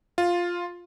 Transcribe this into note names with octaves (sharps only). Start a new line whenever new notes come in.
F4